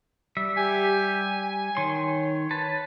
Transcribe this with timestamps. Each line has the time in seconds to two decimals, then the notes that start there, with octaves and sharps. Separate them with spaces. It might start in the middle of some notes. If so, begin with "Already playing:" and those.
0.37 G3 E5
0.57 G4 G#5
1.77 D#3 C#5 C6
2.51 B4 A5